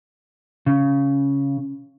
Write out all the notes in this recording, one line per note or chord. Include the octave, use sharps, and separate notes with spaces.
C#3